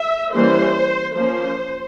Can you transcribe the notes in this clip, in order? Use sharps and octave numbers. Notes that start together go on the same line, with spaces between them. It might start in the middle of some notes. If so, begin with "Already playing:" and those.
Already playing: E5
E3 G3 A#3 C#4 C5
F3 A#3 C#4 C5